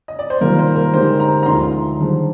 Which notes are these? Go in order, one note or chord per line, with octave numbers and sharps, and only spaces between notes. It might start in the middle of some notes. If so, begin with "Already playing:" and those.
D#5
D5
C5
C3 D#3 G3 A#3 F4 A#4
C5
A#4
D3 G#3 D#4 G4 C5
A#5
A#5
D2 D3 F3 G#3 D#4 C6
D#3 G3 D4 G#4 C5